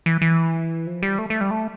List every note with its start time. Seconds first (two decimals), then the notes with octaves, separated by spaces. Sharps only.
0.06 E3
0.22 E3
0.87 F3
1.02 G3
1.19 A3
1.30 A3
1.41 G3
1.51 A3